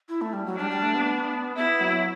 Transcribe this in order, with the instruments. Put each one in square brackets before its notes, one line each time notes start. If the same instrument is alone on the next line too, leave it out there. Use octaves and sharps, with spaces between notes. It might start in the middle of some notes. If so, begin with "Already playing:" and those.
[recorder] E4
A3
G3
F#3
[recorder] G3 [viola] D4
[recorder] G3
A3
B3
[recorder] B3 [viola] E4
[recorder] F#3